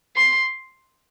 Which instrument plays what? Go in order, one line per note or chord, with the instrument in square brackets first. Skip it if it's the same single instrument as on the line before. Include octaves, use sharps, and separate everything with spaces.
[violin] C6